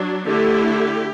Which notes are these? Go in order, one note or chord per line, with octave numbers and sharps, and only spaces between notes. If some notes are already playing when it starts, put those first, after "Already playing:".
Already playing: F#3 D4
D3 A3 E4 G4